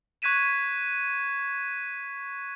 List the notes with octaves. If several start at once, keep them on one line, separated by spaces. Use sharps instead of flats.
C#6 F#6 G#6 B6 D#7 E7